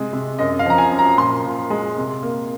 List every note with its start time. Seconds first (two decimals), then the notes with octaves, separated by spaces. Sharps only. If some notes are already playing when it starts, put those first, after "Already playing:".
Already playing: C3 G#3
0.13 C3
0.39 F#2 D#5
0.59 F5
0.65 F3 A#5
0.78 G#5
0.92 F#2
0.99 A#5
1.17 A#2 C6
1.44 A#2
1.70 G#3
1.97 C3
2.23 A#3